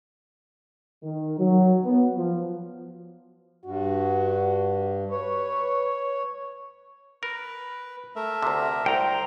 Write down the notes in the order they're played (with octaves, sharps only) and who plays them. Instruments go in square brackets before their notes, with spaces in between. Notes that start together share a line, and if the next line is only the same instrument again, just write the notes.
[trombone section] D#3
F#3
B3
F3
[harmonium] G2 [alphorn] F#4
[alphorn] B4 [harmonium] C#5
[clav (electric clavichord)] A#4 [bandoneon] B4
[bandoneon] A3 A#4 E5
[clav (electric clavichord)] D2 C3
[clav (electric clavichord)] C2 [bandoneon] C5 [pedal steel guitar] G5 A#5